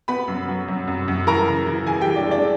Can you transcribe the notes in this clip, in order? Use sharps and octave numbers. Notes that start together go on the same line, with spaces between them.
B3 B4 B5
F#2
F#3
F#2
F#2
F#2
E3 A#4 A#5
C#3
E3
E3 G#4 G#5
G4 G5
E3
D4 D5
G#3
D4 D5